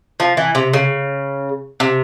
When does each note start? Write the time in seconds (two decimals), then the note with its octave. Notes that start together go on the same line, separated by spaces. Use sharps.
0.20 F3
0.37 E3
0.55 C3
0.73 C#3
1.80 C3